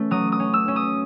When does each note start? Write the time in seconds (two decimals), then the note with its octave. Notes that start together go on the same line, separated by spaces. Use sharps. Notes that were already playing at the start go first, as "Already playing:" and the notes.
Already playing: A3 C#4
0.11 F#3 D#6
0.32 D#6
0.40 C#4
0.54 E6
0.68 C#4
0.76 D#6